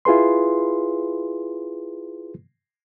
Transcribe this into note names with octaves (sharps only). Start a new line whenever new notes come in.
E4 F4 G#4 B4 C6